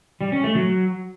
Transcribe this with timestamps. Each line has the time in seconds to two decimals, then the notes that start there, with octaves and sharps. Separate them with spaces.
0.21 G3
0.32 C#4
0.44 A3
0.55 F#3